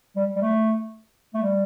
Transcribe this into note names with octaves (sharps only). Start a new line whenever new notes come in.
G3
G3
A3
A3
G3